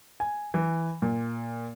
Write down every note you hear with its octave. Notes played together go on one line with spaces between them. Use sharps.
G#5
E3
A#2